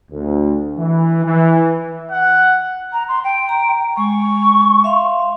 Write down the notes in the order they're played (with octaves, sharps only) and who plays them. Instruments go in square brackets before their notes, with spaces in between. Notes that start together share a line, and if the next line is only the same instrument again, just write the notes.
[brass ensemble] D2
E3
E3
[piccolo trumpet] F#5
[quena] A#5
C6
G5
[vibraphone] A#5
[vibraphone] G#3 [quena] C#6
[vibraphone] E5 F5 C6